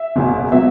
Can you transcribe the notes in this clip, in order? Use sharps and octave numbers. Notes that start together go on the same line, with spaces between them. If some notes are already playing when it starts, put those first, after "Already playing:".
Already playing: E5
F#1 E2 B2
B2 F#3 B3 E5